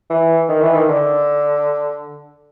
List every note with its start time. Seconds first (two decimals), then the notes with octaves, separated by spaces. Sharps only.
0.10 E3
0.49 D#3
0.62 E3
0.74 D#3
0.89 D3